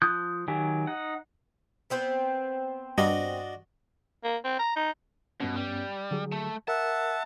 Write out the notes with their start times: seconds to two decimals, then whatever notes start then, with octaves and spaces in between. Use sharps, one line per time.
0.02 F3 D#6 F#6 G6
0.48 D#3 F#3 G4 G#5
0.87 D#4 F#5
1.90 B3 C4 C5
2.98 G2 D4 F#4 D#5
4.24 A#3
4.44 C4
4.59 A#5
4.76 D#4
5.40 G2 B2 B3 C#4
5.56 G3
6.11 D3 F#3 G#4
6.32 A3
6.68 A#4 E5 F#5 A5